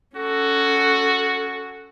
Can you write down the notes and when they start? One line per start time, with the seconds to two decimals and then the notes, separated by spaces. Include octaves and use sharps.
0.16 C#4 F#4 A4